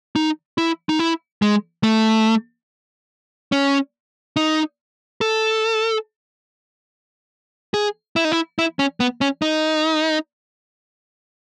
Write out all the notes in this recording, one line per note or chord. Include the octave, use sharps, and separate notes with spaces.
D#4
E4
D#4
E4
G#3
A3
C#4
D#4
A4
G#4
E4
D#4
E4
E4
C#4
B3
C#4
D#4